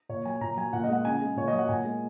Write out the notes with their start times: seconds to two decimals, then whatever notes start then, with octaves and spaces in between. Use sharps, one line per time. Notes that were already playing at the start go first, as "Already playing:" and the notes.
0.09 A#2 C#5
0.25 F#3 G#5
0.41 A#2 A#5
0.57 F#3 G#5
0.73 A#2 F#5
0.84 D#5
0.89 G#3 F#5
1.05 C#3 G#5
1.22 G#3
1.36 A#2 C#5
1.48 D#5
1.53 F#3
1.59 F#5
1.69 A#2 G#5
1.85 G#3